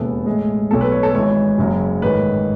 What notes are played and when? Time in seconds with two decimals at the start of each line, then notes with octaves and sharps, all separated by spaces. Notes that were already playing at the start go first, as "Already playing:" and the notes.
Already playing: E1 D#2 C#3 E3 B3 A4
0.26 A1 A2 G#3
0.71 B1 B2 A3 A4
0.81 B4
0.92 C#5
1.03 A4
1.15 G#1 G#2 E3 C#5
1.58 F#1 F#2 C#3 F#3
2.02 A1 G#2 D#3 A3 B4